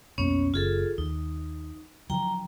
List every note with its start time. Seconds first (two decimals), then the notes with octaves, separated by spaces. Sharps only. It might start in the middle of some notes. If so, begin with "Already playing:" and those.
0.18 B1 F2 A#3 B3 C#4 C#5
0.54 F#1 F4 G#4 A4
0.98 D#2 D#4
2.10 D3 F3 F#3 G5 A#5